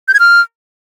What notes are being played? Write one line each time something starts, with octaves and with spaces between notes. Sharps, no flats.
G6
G#6
F6